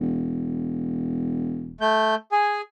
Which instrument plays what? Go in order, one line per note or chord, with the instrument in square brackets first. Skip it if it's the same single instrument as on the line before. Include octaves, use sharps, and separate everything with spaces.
[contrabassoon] E1
[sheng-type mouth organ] A3 G6
G#4 G#5